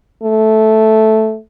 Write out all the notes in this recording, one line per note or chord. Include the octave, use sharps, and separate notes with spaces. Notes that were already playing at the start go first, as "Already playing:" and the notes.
A3